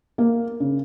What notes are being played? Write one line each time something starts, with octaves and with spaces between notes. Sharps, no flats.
A#3
C#3